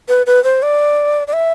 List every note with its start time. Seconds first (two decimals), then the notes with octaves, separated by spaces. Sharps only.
0.09 B4
0.27 B4
0.44 C5
0.62 D5
1.28 D5
1.33 E5